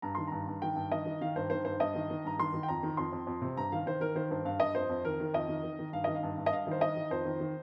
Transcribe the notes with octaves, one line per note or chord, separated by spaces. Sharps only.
G2 A#5
D#3 C6
G2 A#5
G2
D#3 G5
G2
D#3 D#5
D#3
D#3 F5
G2 C5
D#3 C5
G2 C5
G2 D#5
D#3
D#3
G2 A#5
D#3 C6
D#3
G5
F2 A#5
D#3
F2 C6
F2
F2
C3
G2 A#5
D#3 F5
D#3 C5
D#3 A#4
D#3 C5
G2 C5
G2 F5
G2 D#5
F2 C5
F2
D#3 A#4
D#3
F2 D#5
D#3
D#3
D#3
G2 F5
D#3 D#5
F5
G2
G2
D#5
G2 F5
D#3 C5
D#3 D#5
D#3
F2 C5
D#3
D#3